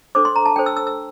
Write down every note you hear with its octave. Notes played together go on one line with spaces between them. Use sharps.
D4 A4 C5 D6
C6
A#5
A5
D4 A4 C5 G5
E6
E6
E6